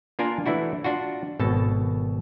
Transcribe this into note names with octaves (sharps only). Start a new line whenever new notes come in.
A#3 D4 F4 A#4 G#5
E3 A3 D4 E4 F#4
D4 F4 F#4
G#1 B2 A4 A5